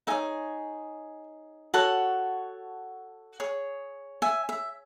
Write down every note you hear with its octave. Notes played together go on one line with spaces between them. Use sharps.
D#4 G#4 C#5 E5 G#5
F#4 A4 C#5 F#5 A5
G#4 C#5
E5 G#5
E5